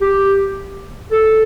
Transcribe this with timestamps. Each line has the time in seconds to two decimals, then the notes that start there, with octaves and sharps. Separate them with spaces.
0.01 G4
1.12 A4